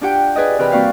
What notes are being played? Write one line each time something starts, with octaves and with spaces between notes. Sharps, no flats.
D4 F4 G4 F#5 G5
G#4 B4 D5 D#5
C3 E3 A#4 B4 G5 B5
G3 A#3 C4 F#4 D5 F5